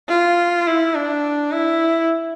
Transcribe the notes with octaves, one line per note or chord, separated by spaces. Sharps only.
F4
E4
D4
E4